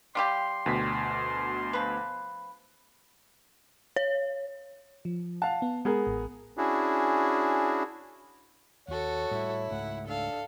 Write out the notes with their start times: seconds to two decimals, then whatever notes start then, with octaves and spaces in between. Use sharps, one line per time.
0.15 G3 F4 G4 C6
0.66 D2 B2 B6
1.73 F3 B4
3.96 C#5
5.05 F3
5.42 F5 F#5 A5
5.62 B3
5.85 G#3 B3 G#4 A#4
6.07 A1
6.57 C#4 D4 E4 F#4 G#4
8.88 D#2 F#4 A4 C#5
9.31 A2 G3 E4
9.71 C#2 G#2 A3 F#5
10.08 D4 A4 F5